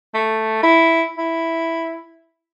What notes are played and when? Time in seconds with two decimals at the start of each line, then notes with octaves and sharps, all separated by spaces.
0.14 A3
0.63 E4
1.18 E4